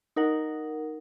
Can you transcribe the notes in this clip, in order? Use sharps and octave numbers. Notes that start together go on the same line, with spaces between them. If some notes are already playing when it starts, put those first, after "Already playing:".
D#4 A#4 F#5